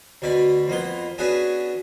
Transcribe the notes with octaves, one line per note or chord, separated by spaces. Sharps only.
D2 B2 D5 B5
F2 A#3 B3 C6
B3 C#4 D4 F#4 G#4 B4